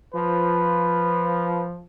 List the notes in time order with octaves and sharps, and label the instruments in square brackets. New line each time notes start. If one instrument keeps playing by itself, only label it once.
[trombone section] F3 [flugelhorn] B4